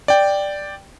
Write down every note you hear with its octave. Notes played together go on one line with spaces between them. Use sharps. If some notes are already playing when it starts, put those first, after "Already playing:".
D5 G5